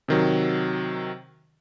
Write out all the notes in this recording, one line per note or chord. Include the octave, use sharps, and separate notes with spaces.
C3 D#3 F#3